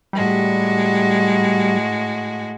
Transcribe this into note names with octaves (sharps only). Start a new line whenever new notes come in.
A2 G3 G#3 F#4